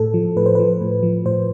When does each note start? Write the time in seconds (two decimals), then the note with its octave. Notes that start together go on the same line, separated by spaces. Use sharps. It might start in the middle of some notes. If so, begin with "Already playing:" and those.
Already playing: A2 A4
0.14 F3
0.37 A2 B4
0.46 C5
0.55 F3 B4
0.81 A2
1.03 F3
1.25 A2 C5